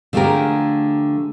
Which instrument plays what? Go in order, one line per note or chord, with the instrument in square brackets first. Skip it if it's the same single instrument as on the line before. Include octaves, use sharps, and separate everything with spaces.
[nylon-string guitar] D3 F3 A3 G4 G#4 A#4